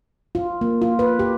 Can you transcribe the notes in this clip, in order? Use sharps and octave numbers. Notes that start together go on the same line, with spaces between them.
F4
A#3
F4
B4
G4